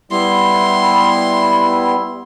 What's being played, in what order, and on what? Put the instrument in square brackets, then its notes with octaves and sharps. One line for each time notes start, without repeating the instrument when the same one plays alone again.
[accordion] G3 B3 E4 [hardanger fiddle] C6